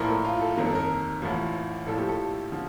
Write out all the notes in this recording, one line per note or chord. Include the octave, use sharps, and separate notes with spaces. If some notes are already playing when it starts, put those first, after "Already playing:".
Already playing: A#1 A2 F3 A#4
A4
F4
A4
G1 F2 D#3 A#4
A4
A#4
A1 A2 F3
A#1 A2 F3 A4
G4
A4
D3 F3